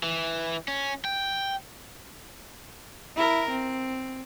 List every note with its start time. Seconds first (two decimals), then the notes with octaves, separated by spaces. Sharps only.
0.03 E3
0.68 C#4
1.05 G5
3.16 E4 A#4
3.50 C4